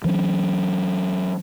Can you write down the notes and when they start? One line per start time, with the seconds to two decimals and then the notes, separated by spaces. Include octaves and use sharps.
0.04 E3 F#3 C#4